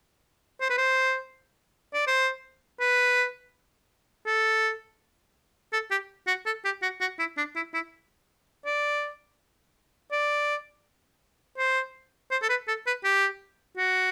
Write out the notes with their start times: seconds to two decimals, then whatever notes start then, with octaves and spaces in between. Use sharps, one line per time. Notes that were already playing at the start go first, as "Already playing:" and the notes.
0.61 C5
0.70 B4
0.78 C5
1.94 D5
2.07 C5
2.80 B4
4.26 A4
5.73 A4
5.91 G4
6.27 F#4
6.46 A4
6.65 G4
6.82 F#4
7.01 F#4
7.19 E4
7.37 D4
7.56 E4
7.74 E4
8.66 D5
10.12 D5
11.58 C5
12.31 C5
12.42 A4
12.49 B4
12.68 A4
12.87 B4
13.04 G4
13.77 F#4